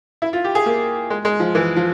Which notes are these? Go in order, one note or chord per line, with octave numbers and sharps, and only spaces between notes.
E4
F4
G4
G#4
A#3
G#3
G#3
F3
E3
F3